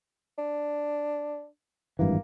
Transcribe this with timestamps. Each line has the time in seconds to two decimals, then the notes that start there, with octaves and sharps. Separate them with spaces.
0.38 D4
1.99 G#1 G2 E3 A#3